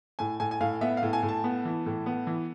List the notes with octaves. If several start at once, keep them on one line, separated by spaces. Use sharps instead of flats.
A2 G#5
A2 G#5
G#5
A2 F5
B3 E5
F5
A2
G#5
A2
A5
B3
E3
A2
B3
E3